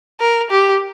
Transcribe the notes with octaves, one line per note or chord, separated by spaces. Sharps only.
A#4
G4